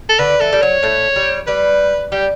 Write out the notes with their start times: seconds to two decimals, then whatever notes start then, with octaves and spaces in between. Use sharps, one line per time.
0.09 A4
0.19 D3 B4
0.41 E3 A4
0.53 G3
0.62 F#3 C#5
0.83 A2 A3
1.16 G3
1.47 G3 B4
2.12 G3 G4